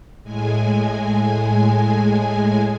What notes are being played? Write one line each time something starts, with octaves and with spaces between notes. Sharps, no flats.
A2 G#3 G#5